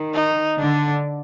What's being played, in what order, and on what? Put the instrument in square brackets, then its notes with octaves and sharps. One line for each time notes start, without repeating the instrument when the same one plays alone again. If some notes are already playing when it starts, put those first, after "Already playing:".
Already playing: [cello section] D#3
[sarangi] D#4
[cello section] D3 [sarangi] D4